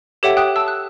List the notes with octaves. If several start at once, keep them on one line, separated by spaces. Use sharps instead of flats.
G4 A4 C#5 E5 F#5 G5
G5 D#6 F#6
A5 E6
F#6